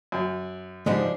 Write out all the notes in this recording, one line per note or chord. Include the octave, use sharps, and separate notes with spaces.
F#2
G#2 C#3 F3 G3 G#3 D4